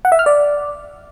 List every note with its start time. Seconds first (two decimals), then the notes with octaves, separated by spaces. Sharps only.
0.05 F#5
0.12 E5
0.19 F6
0.26 D5